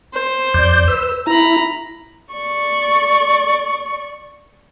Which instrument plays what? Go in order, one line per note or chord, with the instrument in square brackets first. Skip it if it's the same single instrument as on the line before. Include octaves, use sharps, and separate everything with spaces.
[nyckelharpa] C5
[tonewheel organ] F2 D5 G6
B4 E6
[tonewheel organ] E4 [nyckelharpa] A#5 B5
[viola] D5 C#6